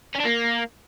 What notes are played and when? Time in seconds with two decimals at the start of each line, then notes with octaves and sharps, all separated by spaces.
0.15 C#4
0.20 D4
0.25 A#3